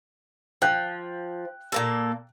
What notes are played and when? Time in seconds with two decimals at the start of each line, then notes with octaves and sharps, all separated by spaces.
0.62 F3 G5 F#6
1.72 A#2 A#3 A4